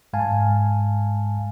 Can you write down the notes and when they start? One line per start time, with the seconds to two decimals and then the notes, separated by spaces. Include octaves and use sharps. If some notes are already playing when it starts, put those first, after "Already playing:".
0.13 G#2 G#3 F5 G#5 A5